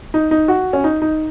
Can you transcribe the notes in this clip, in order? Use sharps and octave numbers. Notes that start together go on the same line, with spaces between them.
D#4
D#4
F#4
C#4
D#4
D#4